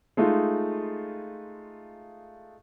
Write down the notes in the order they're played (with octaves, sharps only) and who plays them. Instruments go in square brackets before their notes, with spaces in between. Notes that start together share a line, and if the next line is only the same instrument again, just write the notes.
[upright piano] G#3 A3 D#4 F4